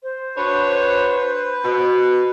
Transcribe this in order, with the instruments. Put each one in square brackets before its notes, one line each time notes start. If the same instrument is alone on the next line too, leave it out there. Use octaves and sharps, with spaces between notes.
[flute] C5
[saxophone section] D4 F#4 C#5 [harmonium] B4
[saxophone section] B2